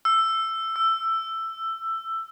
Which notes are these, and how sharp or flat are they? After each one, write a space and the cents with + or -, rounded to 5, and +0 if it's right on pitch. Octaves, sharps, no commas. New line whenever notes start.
E6 +10
E6 +15